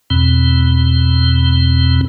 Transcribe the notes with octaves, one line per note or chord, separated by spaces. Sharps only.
E2 B2 C4